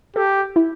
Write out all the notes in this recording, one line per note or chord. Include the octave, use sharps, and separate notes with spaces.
G4 A4
E4